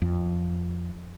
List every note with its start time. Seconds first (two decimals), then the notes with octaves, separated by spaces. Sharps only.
0.02 F2